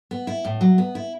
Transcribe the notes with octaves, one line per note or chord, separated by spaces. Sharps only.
B3
E4
A2
F#3
B3
E4